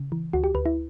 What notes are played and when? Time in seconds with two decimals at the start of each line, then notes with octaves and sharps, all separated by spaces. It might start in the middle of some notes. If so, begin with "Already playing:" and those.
Already playing: C#3
0.12 E3
0.33 D2 F#4
0.44 G4
0.55 D2 B4
0.66 E4